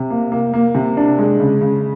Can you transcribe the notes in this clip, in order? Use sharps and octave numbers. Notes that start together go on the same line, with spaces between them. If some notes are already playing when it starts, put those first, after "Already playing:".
Already playing: C3
A#3
A#3
A#3
C3
D4
G#3
C#3
C#3